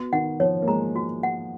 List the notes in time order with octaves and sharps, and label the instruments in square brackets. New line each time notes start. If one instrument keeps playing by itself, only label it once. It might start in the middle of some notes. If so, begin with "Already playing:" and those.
Already playing: [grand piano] B3 [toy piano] F#4
[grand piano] D#3 [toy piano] F#5
[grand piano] F3 [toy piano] C#5
[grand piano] A#3
[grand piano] G#3 [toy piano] A#5
[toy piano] F#4
F#5